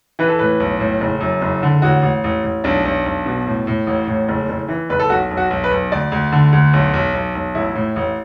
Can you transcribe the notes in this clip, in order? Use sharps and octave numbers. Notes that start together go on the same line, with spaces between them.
E3 B4
A4
A2 B4
B1
A2
F#1
F#2
F#1
D3
A1 F#4
A1
A1
A1
B1 D4
B1
B1
B2
A2
A2
A1
A2
F#1
F#1
E3
F#1 B4
A4
B1 F#4
B1
F#4
B1
B4
B1
D2 D5
D2
D3
D2
B1
B1
B1
B1
A1 E4
A2
A1